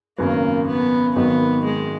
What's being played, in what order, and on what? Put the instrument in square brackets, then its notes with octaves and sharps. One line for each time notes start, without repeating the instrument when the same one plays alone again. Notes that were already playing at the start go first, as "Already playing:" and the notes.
[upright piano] G#1 F#2 C#3 F#3 B3 [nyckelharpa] A#3
[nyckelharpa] B3
[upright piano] G#1 G#2 D#3 F#3 [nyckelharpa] B3
[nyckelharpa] G#3